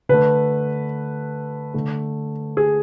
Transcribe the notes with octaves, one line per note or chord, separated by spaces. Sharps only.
D3 A3 B4
D3 A3
G#4